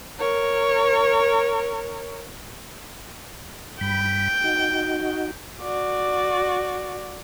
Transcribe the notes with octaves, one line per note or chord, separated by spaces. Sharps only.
A#4 C#5
G2 G5 B5
D#4 F#4
F#4 D5